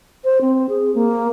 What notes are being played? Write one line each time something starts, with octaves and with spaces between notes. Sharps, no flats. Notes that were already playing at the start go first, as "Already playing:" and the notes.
C5
C4
G#4
A#3